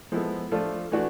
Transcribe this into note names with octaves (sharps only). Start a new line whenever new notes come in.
F3 G#3 B3 E4 A4
F3 A3 D4 F4 A4
E3 A3 D4 F#4